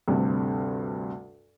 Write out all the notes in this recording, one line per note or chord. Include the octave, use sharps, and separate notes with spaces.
D2 G2 C3